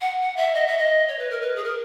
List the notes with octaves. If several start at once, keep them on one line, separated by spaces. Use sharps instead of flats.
F#5
F#5
E5
D#5
E5
D#5
C#5
B4
A#4
B4
G#4
A#4